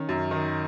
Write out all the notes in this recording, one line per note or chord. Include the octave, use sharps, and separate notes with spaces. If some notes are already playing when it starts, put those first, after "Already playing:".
Already playing: D#3 C#4
F#2
D#3